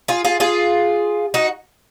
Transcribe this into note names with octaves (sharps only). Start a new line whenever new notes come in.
F4 G#4
F4 G#4
F4 G#4
D#4 F#4